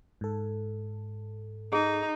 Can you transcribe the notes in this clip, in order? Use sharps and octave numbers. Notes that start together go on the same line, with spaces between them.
G#2 A4
D#4 G#4